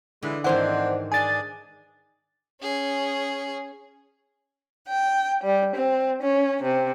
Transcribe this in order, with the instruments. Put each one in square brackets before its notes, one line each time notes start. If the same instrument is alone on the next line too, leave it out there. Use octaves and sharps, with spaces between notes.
[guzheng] D3 [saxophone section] E3 G#3
[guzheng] G#2 D#3 E3 [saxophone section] C4 D4 E4 [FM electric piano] C5 F#5
[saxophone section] D4 G#4 D5 [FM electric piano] G#5 A6
[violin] C#4 G#4
[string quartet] G5
G3
C4
C#4
C3